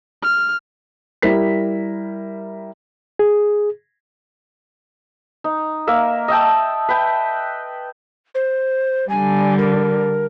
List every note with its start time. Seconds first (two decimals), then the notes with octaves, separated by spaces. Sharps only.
0.23 F6
1.22 G3 E4 A#4 B6
3.19 G#4
5.44 D#4
5.87 A#3 A#4 E5
6.28 D#5 E5 G5 A5
6.89 B4 G5
8.35 C5
9.09 D3 G3 G#5
9.58 A#4